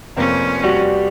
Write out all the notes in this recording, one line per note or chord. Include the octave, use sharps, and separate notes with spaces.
F1 F2 A#3 C4 C#4
G3 F#4